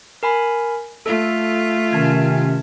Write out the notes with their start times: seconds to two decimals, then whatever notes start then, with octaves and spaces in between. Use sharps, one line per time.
0.23 A#4 G#5 B5
1.06 A3 F4 A4
1.93 C3 D#3 C#4 A5 G#6